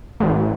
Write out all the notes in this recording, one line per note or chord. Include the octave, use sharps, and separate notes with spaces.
A1